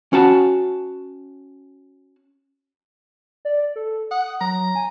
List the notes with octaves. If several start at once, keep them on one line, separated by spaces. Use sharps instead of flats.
C#4 F#4 A5
D5
A4
F#5 D#6
F#3 A#5
G#5